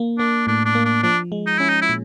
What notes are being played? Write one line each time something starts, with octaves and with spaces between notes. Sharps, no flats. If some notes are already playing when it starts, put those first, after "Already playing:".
Already playing: A#3
A#3 D4
A2 D4
D4
A#3
D4
F3 D4
G#3
D#4
C#4 E4
D#4
E4
A#2